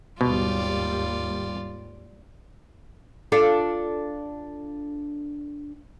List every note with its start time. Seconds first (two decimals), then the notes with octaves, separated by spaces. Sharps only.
0.21 D#2 G#2 B2 G3 F4 D5
3.32 D4 F4 A4